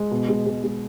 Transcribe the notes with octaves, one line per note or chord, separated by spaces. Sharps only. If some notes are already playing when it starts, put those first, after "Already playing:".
Already playing: G#3
B2
G#3
G#3
G#3